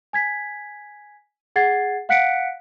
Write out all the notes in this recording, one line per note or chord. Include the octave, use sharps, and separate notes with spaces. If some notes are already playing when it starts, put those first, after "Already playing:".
G#5 G#6 B6
G#4 F#5 G#6 A6 C7
F5 F#5 F#6 B6 C#7 D7